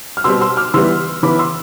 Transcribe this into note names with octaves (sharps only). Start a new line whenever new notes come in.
F6
B2 G3 C4 C6 E6
C6 E6
D6 F6
E3 G3 B3 C6 E6
E3 B3 B5 D6
C6 E6